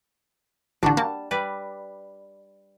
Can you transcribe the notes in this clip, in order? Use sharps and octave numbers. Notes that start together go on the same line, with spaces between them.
A1 D3 D4 F#4
G3 A#3 A5
G3 B4 D5